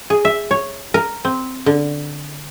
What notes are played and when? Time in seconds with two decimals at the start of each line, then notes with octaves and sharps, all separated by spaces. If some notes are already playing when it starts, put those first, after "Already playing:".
0.10 G#4
0.25 E5
0.51 C#5
0.94 A#4
1.25 C4
1.66 D3